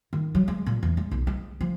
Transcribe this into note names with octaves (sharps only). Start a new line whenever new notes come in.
D#3
F#3
G#3
A#2
E2
G#3
B1
G#3
F3